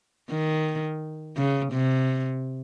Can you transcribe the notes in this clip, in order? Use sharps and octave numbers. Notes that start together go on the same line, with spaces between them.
D#3
C#3
C3